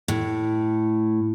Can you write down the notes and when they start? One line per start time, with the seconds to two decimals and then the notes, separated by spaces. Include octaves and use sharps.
0.08 A2